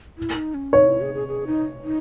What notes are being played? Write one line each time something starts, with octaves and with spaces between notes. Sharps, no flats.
E4
D#4
C#4
D#4 C#5
E4
G#4
G#4
G#4
D#4
D#4